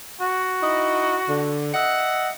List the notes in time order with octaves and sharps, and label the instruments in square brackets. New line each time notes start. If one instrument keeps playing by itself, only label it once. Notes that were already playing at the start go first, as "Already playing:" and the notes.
[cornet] F#4
[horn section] D#4 E4 D#5
D3
D#5 E5 F#5